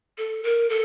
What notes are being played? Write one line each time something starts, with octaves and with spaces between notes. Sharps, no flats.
A4
A#4
A4